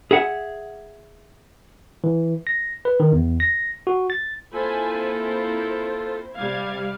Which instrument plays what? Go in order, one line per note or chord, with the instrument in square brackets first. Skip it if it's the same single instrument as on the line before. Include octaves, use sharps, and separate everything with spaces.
[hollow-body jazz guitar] G#4 E5 F#5
[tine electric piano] E3
A#6
B4
D#3
E2
A#6
F#4
A6
[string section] A#3 C4 E4 [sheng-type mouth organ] F4 A4 [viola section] C5 G#5 B5
[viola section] C5
[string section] C3 G#6 [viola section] G3 D5 F5